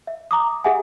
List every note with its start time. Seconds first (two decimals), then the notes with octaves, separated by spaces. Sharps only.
0.07 E5
0.31 A#5 D6 D#6
0.64 G4 G#4 E5 F#5 G#5